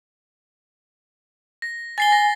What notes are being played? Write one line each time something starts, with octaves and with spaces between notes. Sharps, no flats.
A#6
G#5 A6 C7 G7
A#6